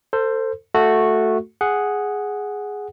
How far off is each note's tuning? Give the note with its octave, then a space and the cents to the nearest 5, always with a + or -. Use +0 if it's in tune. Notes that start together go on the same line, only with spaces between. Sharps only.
A4 +30 C5 +0
A3 +0 F#4 -10 A4 +0
G#4 +0 F#5 +0